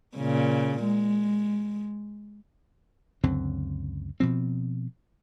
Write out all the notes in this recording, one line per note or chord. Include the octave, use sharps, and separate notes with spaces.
A#2 C#3
G#3
C#2 F#2 D3 C4
B2 F3 C4